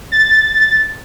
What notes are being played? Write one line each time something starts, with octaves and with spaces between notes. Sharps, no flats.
A6